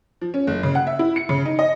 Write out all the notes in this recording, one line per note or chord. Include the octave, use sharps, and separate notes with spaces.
F3
C#4
F#1
C#3
F#5
E5
E4
C#7
C#3
D#4
D#5